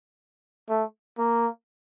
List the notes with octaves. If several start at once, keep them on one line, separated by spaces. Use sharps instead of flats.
A3
A#3